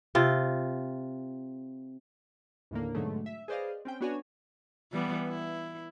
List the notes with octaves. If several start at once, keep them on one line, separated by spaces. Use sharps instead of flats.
C3 F4
D#2 A2 D3 A#3
G#2 B2 D3 F#3 G#3 A3
E5
G#4 B4 C5 D5 D#5 F5
C4 C#4 G5
B3 D4 F#4 C#5 G#5
E3 G3 B3
E4